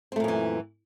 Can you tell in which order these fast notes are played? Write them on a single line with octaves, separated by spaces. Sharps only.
C4 A3 A#2 F#2 E3